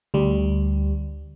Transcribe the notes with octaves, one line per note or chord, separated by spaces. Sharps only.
D2 G3